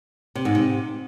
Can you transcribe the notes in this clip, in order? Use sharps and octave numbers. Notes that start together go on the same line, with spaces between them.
C3
G#2
C3